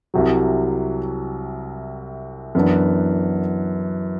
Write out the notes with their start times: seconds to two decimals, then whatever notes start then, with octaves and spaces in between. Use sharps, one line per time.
0.14 C2 C3 F#3
2.55 F#2 E3 B3 D4